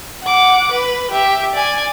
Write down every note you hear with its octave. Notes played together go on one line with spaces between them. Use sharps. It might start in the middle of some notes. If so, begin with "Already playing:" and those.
F#5 D6
B4
G4 E5
D5 G#5